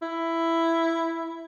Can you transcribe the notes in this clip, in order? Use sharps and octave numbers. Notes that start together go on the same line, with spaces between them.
E4